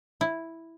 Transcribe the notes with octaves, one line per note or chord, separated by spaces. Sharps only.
E4